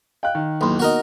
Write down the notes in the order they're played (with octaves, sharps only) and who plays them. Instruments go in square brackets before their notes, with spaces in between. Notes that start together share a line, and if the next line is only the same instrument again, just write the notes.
[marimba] D#5 F5 [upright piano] G5 F#6
[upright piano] D#3
[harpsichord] B1 E2 [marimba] A#3 B5 C6
[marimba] B3 D#4 [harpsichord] F#4 A#4 D#5